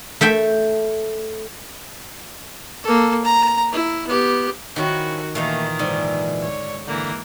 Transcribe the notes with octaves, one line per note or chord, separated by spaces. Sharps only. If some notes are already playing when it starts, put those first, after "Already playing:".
A3 E5 G5
A#3 A4
A#5
E4
B3 G4
D#3 F3 C#4 E4 F#4
A#2 D#3 E3 A3 A#3 D#4 F5
G#2 D3
C#5
D3 E3 A#3